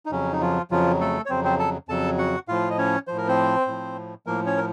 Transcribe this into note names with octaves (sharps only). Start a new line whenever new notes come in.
D#4
F2 C#3 F#3 C#4
D#4
F3 F4
F2 C#3 F3 F#3 F4
A3 A4
C#5
F2 C#3 F#3 C4 C5
C4 C5
A4 A5
F2 C#3 F#3 A4 A5
F#4 F#5
A2 F3 F4 F5
D#5
C#4 C#5
A2 F3 C5
A#4
C4 C5
A2 F3
A2 F3 A#3 A#4
C#4 C#5
A#4